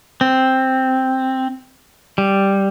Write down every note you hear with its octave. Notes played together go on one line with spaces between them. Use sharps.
C4
G3